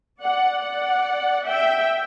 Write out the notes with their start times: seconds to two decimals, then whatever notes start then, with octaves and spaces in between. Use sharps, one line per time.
0.22 D5 F#5
0.64 D5 F#5
1.46 E5 G5